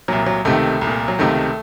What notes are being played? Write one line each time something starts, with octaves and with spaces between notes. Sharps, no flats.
C2 A#2 F#3
F#3
C#2 C3 D#3 A3
C2
A#2
F#3
C#2 C3 D#3 A3